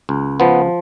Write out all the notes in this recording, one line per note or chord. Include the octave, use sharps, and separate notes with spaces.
C#2
F3 B3